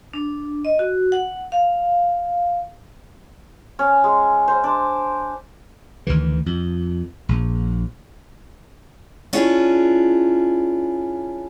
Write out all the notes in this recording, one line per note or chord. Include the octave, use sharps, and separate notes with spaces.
D4
D#5
F#4
F#5
F5
C#4
G#3
C5
D4
D2 D#3 E3
F2
A#1
C#4 D4 E4 F4 G#4